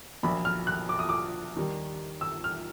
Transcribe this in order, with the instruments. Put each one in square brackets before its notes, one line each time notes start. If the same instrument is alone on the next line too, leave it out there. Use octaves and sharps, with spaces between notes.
[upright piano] A#1 A#2 F#3 A#3 B5
F6
F#6
D6
D#6
D6
D#2 D#3 G3
E6
F6